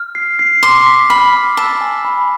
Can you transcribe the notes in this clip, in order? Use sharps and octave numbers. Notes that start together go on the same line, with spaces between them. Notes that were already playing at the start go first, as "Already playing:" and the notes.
Already playing: F6
C7
C7
C6 D6
B6
B5 F6
D6
A5 E6
G#5
B5